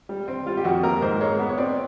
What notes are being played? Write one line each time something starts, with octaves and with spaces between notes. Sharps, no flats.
G3
C4
G3 F4
G4
F2 F#4
A#3 A#4
G#2 C5
G#3 C#5
B3
C#5
C4 D5